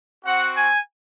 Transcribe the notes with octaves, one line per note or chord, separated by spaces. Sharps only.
C4 F#4 F#5
G#5